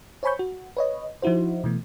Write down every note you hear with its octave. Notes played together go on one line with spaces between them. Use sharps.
C5 C#5 G#5 B5 C#6 G6
F#4
B4 C#5 D#5
F3 D#4 E4 F#4 C5
B2 E3 A3